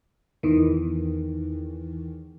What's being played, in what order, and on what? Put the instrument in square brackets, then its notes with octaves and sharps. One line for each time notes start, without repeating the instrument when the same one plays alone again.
[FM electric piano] E2 D#3 E3